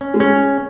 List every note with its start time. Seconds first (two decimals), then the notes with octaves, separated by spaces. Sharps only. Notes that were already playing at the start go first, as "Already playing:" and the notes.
0.01 C#4
0.14 G#3
0.20 C#4